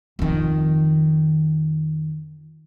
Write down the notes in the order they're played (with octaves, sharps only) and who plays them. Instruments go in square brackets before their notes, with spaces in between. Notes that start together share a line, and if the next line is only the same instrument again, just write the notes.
[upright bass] F2 D#3